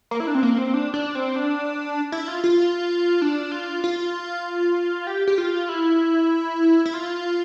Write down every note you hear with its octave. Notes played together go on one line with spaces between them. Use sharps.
A#3
E4
D4
C4
A#3
C4
D4
D4
C4
D4
E4
F4
F4
D4
F4
F4
G4
G4
F4
E4
E4
F4